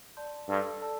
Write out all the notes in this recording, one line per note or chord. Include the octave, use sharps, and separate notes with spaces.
D5 A5 C6 G6
G2 A4 D5 A5 E6
A4 D5 A5 E6